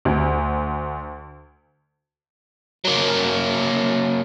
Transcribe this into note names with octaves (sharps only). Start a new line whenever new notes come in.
D2
F#3 A#3